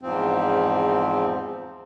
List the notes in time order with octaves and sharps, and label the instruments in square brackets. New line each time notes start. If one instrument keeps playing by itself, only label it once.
[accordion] E2 G#2 F3 C4